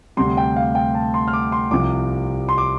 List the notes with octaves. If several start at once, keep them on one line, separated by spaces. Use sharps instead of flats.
D2 C3 G3 C6
G5
F5
G5
A5
C6
F6
D6
C6
C2 C3 F3 D6
C6
D6